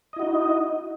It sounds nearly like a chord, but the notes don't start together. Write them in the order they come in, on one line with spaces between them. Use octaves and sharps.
D#5 E4 F#4 D#4